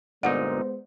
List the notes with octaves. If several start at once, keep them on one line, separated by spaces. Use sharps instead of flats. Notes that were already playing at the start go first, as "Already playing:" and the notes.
G1 A#2 G#3 B3 D#4 C5 D5 F#5